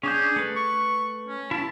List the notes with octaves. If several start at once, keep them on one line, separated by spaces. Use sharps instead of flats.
C#4 D4 G#4 G6
A3 B4
C#6
C#4
C#4 E4 A5